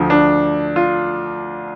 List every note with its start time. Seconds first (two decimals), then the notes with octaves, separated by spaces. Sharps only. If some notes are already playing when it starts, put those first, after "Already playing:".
Already playing: D2 D3 F3
0.10 D4
0.76 F4